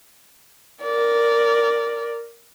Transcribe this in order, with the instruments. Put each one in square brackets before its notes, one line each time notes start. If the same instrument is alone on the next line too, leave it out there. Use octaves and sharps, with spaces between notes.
[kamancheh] A#4 D5